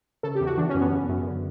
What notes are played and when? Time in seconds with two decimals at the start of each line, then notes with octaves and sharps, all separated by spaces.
0.23 C#3 A4
0.35 G4
0.41 E2
0.46 F#4
0.57 E3 D4
0.70 C#4
0.75 F#2
0.81 B3
0.92 C#3
1.09 F#2
1.27 D3